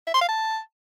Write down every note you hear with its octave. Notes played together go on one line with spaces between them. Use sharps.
E5
C6
F5
A5